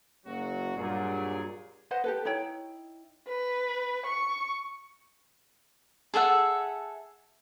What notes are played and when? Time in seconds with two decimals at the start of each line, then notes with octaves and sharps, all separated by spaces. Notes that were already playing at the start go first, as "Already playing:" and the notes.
0.25 F#1 F#3 F#4
0.77 G2 A#2 F#3 G#4
1.91 B4 C5 D#5 F#5
2.04 G4 A4 B4
2.25 D#4 E4 C#5 G5
3.27 B4
4.06 C#6
6.14 G#4 A4 E5 F#5